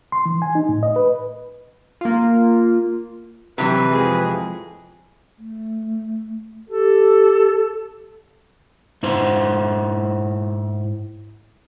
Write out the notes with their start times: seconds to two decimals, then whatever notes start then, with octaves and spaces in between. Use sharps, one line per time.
0.12 C6
0.26 E3
0.42 G#5
0.55 D#4
0.69 A2
0.83 D#5
0.96 B4
2.01 A#3 F4
3.58 C3 E3 F#3 G3 B4
3.92 F2 G#3 G#4
5.38 A3
6.70 G4 A4
9.03 G#2 E4 C5